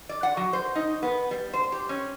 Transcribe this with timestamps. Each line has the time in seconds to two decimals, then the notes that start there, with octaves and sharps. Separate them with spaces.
0.09 D5
0.23 F#5
0.37 F#3
0.53 C5
0.75 D#4
1.03 B3
1.31 G3
1.53 C5
1.72 G4
1.89 C#4